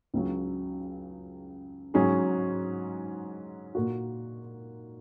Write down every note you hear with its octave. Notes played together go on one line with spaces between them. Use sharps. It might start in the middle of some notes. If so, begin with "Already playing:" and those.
C#2 C#3 F#3
G#2 F#3 C#4 G#4
A#2 A#3 F#4